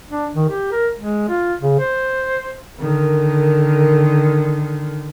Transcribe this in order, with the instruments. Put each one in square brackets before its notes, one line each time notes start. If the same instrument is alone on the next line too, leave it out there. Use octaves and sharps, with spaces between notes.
[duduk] D4
D#3
G4
A#4
G#3
F4
C#3
C5
[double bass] D3 D#3 [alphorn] A#4